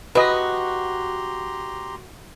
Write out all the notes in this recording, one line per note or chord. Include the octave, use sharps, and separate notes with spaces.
F#4 G4 B4 D#5 A#5 C6